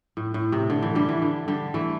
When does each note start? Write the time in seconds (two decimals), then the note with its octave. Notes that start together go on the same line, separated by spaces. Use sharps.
0.17 A2
0.34 A2
0.52 C3
0.70 D3
0.82 E3
0.95 D3 G3
1.09 E3
1.22 D3
1.48 D3 G3
1.74 E3 A3